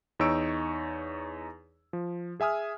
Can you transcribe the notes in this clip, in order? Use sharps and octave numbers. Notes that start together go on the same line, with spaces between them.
E2 D#4 C#5 C#6 E6 D7
F3
G#4 E5 G#5 D#6 F6